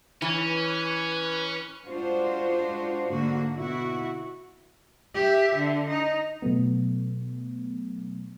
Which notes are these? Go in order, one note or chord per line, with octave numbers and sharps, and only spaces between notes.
E3 C#4 B4
G#3 D4 F4 F#4 C5
G#2 D3 A#3 F#4
B2 E4 F#4
G4 E5
D3
D#4
B2 F#3 A3 B3